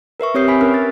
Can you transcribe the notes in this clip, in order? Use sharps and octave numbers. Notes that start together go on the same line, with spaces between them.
A#4 B4 E5 C#6
C4 G4 C#5 D#6 G6 C7
E5 G#5 B5 B6
C#4 A#4 B4 F6
A6